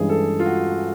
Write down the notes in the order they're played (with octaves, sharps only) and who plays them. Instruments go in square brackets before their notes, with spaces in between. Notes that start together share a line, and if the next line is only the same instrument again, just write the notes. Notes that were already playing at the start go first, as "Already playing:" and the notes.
Already playing: [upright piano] G2 E3 G#3 C#4 [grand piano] G#4
[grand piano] A4
F4
F#4